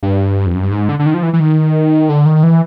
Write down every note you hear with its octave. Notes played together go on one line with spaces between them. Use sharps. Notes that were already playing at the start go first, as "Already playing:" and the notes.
G2
F2
F#2
G2
G#2
D3
D3
D#3
F3
E3
E3
D#3
D3
D#3
E3